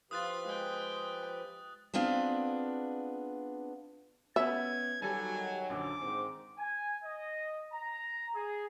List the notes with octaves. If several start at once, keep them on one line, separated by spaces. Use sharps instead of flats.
F3 F4 G4 B4 D#6 F#6 A6
G#3 G5
B3 C4 D4 F4 G#4
B3 C#4 E5 G#6
D#3 F#3 G3 A4 G#5
A#1 F#2 D3 D6
G#2 D#3 C4
G#5
D#5
A#5
G#4